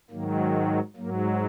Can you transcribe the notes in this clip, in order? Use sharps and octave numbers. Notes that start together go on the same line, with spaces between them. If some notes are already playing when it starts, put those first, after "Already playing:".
G#2 D#3 F#3 A#3
G#2 F#3 A#3